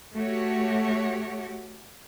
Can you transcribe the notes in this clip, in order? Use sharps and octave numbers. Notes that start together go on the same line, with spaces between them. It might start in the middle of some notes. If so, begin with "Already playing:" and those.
A3 F#4 G4 C#5